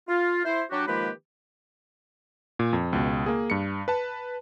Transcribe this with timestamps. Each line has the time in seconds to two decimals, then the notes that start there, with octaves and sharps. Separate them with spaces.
0.09 F4
0.45 E4 C5
0.71 F#3 D4 F#4 G4
0.87 D#3 F3 G#3 A#3 G4 B4
2.59 A#2
2.73 F2
2.93 C#2 B2
3.26 A#3 G#4
3.50 G2 C#7
3.88 B4 A5